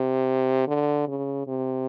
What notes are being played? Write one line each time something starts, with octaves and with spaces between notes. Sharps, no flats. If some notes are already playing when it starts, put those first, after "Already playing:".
Already playing: C3
D3
C#3
C3